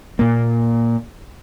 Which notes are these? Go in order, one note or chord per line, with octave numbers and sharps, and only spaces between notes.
A#2 A#3